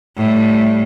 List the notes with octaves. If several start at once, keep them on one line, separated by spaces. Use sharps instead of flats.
A2 G3